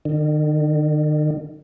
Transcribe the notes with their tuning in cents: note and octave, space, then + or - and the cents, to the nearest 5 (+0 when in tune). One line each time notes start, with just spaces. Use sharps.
D#3 -45